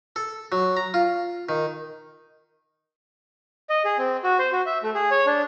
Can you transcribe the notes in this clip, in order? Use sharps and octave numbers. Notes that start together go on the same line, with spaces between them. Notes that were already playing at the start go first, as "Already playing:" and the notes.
A4
F#3
A#5
F4
D#3
D#5
G#4
C4
F#4
C5
F#4
E5
A3
G#4
C#5
D4